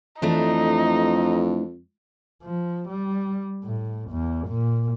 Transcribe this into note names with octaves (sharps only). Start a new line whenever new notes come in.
F2 E3 A3 D4 D#4
F3
G3
A2
E2
A#2